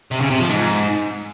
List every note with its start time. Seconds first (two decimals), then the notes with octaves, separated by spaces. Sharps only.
0.11 C3
0.21 C#3
0.30 C3
0.40 F3
0.49 G#2